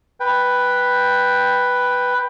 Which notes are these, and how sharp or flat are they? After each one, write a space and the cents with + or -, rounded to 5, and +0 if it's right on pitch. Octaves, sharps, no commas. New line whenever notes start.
B4 +0 G5 +5